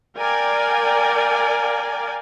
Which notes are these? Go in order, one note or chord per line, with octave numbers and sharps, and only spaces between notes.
A#4 D5 F5 G5 G#5